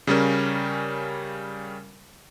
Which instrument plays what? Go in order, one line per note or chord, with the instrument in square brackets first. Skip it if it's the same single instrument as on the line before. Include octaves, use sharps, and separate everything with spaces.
[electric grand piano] C#3 G3 C#4 A#4